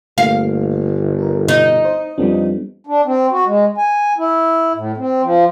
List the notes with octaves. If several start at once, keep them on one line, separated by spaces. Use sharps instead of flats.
G1 A3 A#3 F5
A4 A#4
B2 D#4
C5
F2 G3 B3 D4
D4
C4
F#4
G#3
G#5
E4
A2
C4
F3